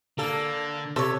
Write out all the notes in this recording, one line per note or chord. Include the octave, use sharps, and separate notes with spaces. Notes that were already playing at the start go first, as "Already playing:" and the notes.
D3 A#3 A4
C3 A4 C#5